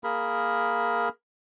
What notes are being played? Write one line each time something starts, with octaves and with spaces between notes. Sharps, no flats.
A#3 G#4 A#4 B5